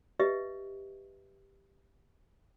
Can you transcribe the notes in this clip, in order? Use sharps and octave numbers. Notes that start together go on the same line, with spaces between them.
G4 B4 D#5 E5